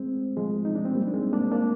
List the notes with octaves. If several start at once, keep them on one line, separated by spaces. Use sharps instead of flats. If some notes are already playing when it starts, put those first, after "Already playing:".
Already playing: G#3 C4
F3 G#3
D#4
D4
C4
G3 A#3
D4
G#3 C4
A#3 D4
A#3 D4